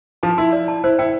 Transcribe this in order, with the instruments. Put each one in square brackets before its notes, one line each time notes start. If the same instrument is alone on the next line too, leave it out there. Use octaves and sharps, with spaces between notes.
[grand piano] F3 [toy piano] A5
[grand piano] E4 [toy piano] C6
[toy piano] D5
A5
[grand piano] E4 [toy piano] C5
[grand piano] E4 [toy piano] G5